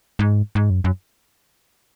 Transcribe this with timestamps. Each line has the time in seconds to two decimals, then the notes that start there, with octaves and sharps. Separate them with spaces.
0.19 G#2
0.55 G#2
0.70 F#2
0.84 F#2